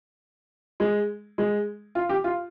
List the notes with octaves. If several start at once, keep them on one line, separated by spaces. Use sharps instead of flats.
G#3
G#3
F4
G4
F4